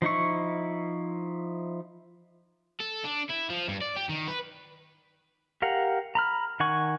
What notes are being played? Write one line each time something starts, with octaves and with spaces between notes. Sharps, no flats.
F3 D#4 E4 C#6
A4
D4
E4
F3
G2
D5
G4
D#3
B4
G4 A#4 F5 F#5
A#5 B5 F6
D#3 F#5 G#5 C#6